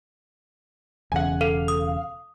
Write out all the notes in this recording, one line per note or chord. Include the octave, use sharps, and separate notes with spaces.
E1 E2 C#3 F#5 G#5
A4 F5
D#6